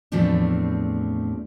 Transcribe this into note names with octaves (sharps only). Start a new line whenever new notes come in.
E2 A2 F3 A3 C4 D4